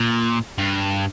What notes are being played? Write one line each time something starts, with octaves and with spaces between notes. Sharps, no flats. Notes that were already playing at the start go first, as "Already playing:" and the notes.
Already playing: A#2
G2